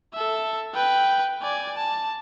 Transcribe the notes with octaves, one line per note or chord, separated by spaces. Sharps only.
A4 E5
B4 G5
D5 G#5
A5